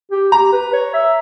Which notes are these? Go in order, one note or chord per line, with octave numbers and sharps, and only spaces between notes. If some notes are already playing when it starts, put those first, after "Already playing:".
G4
G4 A#5
B4
C#5
E5